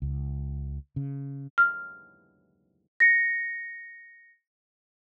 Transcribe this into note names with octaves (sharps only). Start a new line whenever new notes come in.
C#2
C#3
F6
A#6 C#7